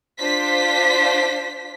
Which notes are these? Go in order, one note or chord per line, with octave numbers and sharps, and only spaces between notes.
D4 F4 C5 B6